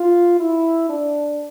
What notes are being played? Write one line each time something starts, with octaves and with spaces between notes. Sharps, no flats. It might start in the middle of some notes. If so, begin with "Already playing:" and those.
Already playing: F4
E4
D4